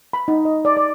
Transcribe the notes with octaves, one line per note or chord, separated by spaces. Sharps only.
B5
D#4
D#5
D5
D5